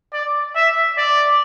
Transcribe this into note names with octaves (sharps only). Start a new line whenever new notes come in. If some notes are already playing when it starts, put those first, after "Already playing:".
D5
E5
D5